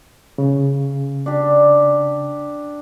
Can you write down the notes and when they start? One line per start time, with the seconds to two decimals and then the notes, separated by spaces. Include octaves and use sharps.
0.38 C#3
1.26 D4 G4